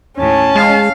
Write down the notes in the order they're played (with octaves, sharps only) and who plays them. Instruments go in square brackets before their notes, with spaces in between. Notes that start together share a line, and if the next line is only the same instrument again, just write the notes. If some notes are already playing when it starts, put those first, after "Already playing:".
[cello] D#2 A2 [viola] C#4 A5
[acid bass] G#3 [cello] F5